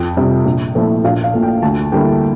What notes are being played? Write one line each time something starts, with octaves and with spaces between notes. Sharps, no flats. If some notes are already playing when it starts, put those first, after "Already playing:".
Already playing: F2 G5
C3 G3
A#1
A#2 F3 A3 E4
A#1 F5
F5
A#2 A3
G5
D2 A5
D3 G3 A#3 E4 G5